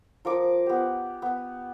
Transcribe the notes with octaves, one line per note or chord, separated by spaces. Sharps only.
F3 A#4 D6
B3 G4
B3